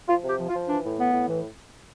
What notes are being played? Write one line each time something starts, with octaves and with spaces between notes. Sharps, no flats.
F3 F4
C3 G4
F3
F4
F3
E3 D4
A2
E3 B3
A2
E3